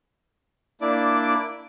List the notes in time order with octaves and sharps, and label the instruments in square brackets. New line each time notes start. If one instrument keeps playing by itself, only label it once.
[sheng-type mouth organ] A#3 D4 E4 D5 D6